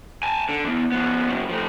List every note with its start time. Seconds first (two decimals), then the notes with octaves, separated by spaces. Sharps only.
0.23 G#5 A5
0.49 D3
0.64 E3 B3
0.92 F3 B3
1.29 C#3 F#3
1.49 F3 A3